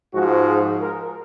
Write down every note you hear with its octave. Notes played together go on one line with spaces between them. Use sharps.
G#2 F3 F#4
G#4
A#4